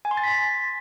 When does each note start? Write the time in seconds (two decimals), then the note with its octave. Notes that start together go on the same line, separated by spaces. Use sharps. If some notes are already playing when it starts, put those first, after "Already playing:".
0.05 G#5
0.11 C6
0.17 A6
0.23 B6